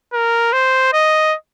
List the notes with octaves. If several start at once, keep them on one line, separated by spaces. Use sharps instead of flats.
A#4
C5
D#5